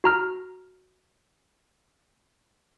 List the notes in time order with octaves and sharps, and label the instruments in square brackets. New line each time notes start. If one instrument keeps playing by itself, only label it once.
[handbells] F#4 A#5 F6